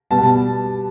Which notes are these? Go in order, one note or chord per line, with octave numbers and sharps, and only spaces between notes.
B2 G3 B3 A5